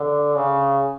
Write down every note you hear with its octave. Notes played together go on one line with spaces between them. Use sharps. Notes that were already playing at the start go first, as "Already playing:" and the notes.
Already playing: D3
C#3